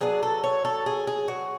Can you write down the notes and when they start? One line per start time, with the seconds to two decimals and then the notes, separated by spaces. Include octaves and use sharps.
0.01 F#3 B3 D4 G#4
0.23 A4
0.44 C#5
0.65 A4
0.86 G#4
1.07 G#4
1.28 F#4